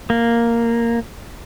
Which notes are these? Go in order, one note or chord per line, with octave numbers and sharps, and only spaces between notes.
A#3